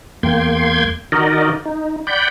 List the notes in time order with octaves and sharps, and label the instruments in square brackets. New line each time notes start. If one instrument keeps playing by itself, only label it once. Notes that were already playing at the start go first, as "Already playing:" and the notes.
[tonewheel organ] E2 A#3 G5 C6 G#6
D#3 D#4 F#4 A#4 D5 D#5
D#4
D5 F#5 G5 B5 G6